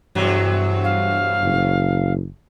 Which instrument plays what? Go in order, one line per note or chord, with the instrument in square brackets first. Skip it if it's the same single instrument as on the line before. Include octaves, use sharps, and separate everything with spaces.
[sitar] E2 C3 F#3 [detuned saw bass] G2
[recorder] F5
[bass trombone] F#1